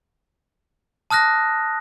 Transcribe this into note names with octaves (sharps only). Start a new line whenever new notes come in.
A5 D#6 F6 F#6 A#6